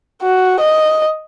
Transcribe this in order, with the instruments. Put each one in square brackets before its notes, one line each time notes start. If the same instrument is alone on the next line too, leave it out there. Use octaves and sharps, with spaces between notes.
[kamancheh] F#4
D#5